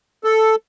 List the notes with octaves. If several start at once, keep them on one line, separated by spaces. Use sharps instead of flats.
A4